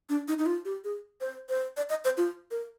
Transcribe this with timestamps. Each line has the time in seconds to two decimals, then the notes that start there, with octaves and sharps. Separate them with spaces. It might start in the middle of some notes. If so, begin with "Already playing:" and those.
0.09 D4
0.28 D#4
0.39 D#4
0.46 F4
0.65 G4
0.84 G#4
1.21 C5
1.49 C5
1.77 D5
1.90 D#5
2.05 C5
2.17 F4
2.51 A#4